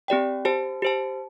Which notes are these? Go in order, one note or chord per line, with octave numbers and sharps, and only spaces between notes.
C4 G4 D5 G5
G4 C5 A5
G4 C5 A5